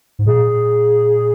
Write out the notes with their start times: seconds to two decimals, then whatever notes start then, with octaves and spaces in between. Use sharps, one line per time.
0.19 G#2
0.26 A#2 G#4